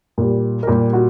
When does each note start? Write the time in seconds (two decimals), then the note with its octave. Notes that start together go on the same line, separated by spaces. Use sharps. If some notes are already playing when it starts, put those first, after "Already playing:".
0.18 A#2 G3
0.63 A#4
0.67 A#2 G3 G4
0.93 F#4